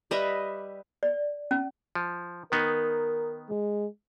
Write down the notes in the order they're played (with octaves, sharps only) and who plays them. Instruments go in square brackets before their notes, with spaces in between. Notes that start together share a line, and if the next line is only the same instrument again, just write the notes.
[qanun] G3 B4 D#5 E5
[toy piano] D5
C#4
[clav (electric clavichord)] F3
[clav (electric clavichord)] D#3 B3 D#4 [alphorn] A#4
[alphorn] G#3